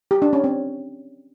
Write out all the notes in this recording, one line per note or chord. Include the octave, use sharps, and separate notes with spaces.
G4
D4
C#4
C4